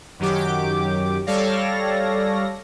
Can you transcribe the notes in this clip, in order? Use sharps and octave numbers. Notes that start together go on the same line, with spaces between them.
F#2 D#3 F#3 G4 D6
G3 A4 C#5 D5 F5 A#6